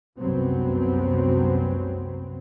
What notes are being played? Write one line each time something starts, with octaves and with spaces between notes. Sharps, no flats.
F1 C2 F#2 F#3 B3 C4